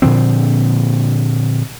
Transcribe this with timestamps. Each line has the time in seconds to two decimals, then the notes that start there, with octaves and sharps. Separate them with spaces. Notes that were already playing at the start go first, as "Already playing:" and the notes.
0.02 A#2 D3 F3 C4